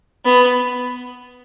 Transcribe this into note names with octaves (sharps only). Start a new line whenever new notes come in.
B3